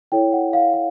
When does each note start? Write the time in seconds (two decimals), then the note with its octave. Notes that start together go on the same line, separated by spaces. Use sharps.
0.12 E4 A4 C#5 G5
0.32 F#5
0.53 F5
0.73 F5